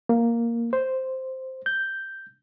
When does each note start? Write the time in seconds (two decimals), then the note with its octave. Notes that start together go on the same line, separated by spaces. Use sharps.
0.09 A#3
0.73 C5
1.66 G6